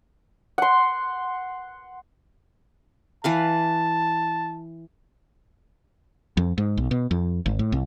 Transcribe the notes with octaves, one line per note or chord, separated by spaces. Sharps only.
F#5 C6
E3 B4 F5 A5
F2
G#2
B1
B2
F2
G#1
A2
C2